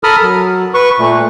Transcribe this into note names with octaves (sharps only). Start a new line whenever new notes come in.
A4 A#4 A5 B5 D#6 F6
F#3
B4 C#6
A#2 A3